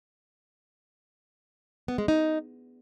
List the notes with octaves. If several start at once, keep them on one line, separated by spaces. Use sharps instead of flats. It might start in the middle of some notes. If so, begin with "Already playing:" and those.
B3
G#3
D#4